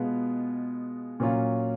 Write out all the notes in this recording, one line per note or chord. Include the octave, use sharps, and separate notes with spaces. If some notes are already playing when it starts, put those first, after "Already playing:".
Already playing: B2 G#3 B3 F4
A#2 F#3 C#4 F4